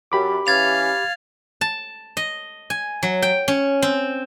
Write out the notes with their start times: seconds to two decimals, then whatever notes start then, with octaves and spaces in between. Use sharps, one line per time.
0.12 F#2 G4 B5 D6
0.47 E3 C#4 F5 G#6 A6 F7
1.61 A5
2.17 D#5
2.70 G#5
3.03 F#3
3.22 G5
3.48 C#4
3.82 C4